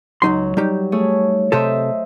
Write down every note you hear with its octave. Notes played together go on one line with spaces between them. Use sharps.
C#2 F#3 D#4 C6
G3 D#4 G4
A3 G#4 C#5
C3 G4 A4 C5 D#5 E5